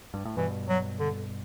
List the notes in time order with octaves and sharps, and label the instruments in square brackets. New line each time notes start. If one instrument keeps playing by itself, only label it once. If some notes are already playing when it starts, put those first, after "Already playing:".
[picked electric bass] G2
A2
[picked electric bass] G2 B2 [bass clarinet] E3
[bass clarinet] F#3
D3